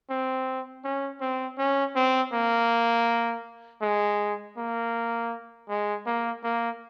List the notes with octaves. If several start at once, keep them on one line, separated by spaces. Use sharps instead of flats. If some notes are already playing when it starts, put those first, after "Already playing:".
C4
C#4
C4
C#4
C4
A#3
G#3
A#3
G#3
A#3
A#3